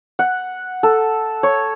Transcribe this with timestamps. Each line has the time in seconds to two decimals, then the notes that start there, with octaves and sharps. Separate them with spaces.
0.19 F#5
0.83 A4
1.43 C#5